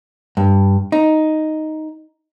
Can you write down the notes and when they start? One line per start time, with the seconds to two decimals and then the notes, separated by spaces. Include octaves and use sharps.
0.37 G2
0.92 D#4